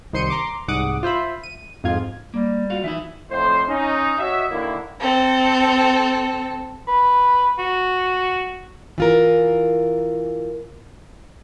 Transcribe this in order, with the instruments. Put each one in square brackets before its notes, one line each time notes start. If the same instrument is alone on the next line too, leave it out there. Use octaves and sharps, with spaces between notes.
[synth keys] C2 D#3 C5 C6 C#7 D#7
A#5 C6 D6
C2 G#2 F#5 D6 D#6
F4 C5 E5 B5
D#7
F2 G#2 F4 G#6
[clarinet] G3 [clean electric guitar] A#3
[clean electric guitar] F4 F#4 F5
[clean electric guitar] E3 D#4 E4 [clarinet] E5
[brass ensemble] F2 A2 C5
C#4 D#4
F#4 C#5 D#5 E5
D3 D#3 A#3 E4
[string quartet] C4 A4
[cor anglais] B4
F#4
[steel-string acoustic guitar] E3 F4 A#4